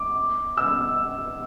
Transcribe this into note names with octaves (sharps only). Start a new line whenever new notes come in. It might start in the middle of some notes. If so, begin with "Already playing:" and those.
Already playing: D6
E6